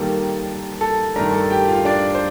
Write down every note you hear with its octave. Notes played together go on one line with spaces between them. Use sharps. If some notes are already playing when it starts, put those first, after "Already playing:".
Already playing: D#3 G3 A#3 A4
A4 A5
G2 D#3 A3 D4 A#4 A#5
A4 A5
G4 G5
F4 F5
D4 D5
C5